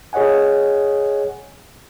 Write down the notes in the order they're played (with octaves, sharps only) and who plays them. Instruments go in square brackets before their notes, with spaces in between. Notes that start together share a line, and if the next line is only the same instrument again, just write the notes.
[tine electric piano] G#4 C#5 D#5 F#5 G#5